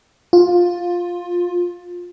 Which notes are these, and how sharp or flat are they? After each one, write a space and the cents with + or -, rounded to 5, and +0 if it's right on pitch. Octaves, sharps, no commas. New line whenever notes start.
F4 +15